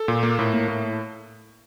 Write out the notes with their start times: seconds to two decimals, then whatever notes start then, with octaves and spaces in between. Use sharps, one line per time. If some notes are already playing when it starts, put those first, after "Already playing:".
Already playing: A4
0.08 A#2
0.23 A#3
0.39 A2
0.54 A#3
0.68 A2